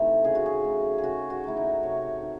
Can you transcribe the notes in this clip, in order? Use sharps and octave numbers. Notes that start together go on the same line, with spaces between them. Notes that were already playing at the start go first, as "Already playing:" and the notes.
Already playing: C3 E3 A3 D#4
C#3 G#4
F#4
G#4
F#3 A3
G#4
C#3 F#4
F#4
F#3 A3 E4
D#4
C3 C#5
D#3